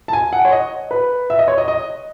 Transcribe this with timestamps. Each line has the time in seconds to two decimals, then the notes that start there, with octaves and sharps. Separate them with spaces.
0.08 A5
0.13 G#5
0.33 F#5
0.45 C#5
0.52 D#5
0.91 B4
1.30 E5
1.39 D#5
1.48 C#5
1.58 D#5
1.68 D#5